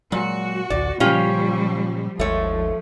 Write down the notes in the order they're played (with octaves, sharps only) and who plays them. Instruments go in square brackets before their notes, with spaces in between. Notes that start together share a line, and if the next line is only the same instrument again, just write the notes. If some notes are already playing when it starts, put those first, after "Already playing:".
[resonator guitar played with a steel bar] A#2 [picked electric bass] F#3 G#3 [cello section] F#4
[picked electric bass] A1 D2 [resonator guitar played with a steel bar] D5
[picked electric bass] A#2 C#3 [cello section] F3 G3 [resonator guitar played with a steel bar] C#4 F4 G4
[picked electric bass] G#1 D#2 G#2 [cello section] F3 [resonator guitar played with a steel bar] A3 C#5